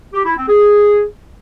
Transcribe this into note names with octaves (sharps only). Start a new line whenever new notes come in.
G4
E4
C4
G#4